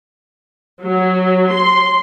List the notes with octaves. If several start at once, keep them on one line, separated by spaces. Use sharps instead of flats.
F#3
C6